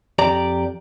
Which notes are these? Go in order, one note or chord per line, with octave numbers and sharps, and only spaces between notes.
F2 G4 D5 A#5